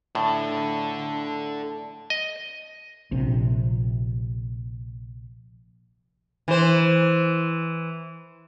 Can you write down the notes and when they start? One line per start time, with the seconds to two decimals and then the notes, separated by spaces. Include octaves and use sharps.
0.15 A2 D4 A4
2.10 D#5
3.11 A#1 C3
6.48 E3 C5